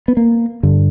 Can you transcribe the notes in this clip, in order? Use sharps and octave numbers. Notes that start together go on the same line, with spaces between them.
B3
A#3
G2 D3